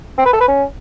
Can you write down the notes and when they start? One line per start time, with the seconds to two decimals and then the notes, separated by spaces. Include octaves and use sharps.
0.18 C4
0.25 B4
0.33 A4
0.40 B4
0.48 C#4